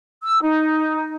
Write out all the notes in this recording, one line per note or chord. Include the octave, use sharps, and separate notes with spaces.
E6
D#4